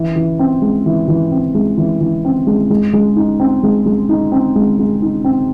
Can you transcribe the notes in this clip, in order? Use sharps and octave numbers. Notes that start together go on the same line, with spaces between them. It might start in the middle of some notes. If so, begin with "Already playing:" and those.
Already playing: E3
E3
C4
G#3
E3
E3
C4
G#3
E3
E3
C4
G#3
G#3
G#3
D#4
C4
G#3
G#3
D#4
C4
G#3
G#3
D#4
C4